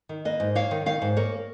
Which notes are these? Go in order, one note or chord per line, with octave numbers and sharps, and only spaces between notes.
D#3
A#3 B4 D#5
G#2
A#3 C#5 F5
D#3
D#3 C#5 F5
G#2
A#3 A#4 C#5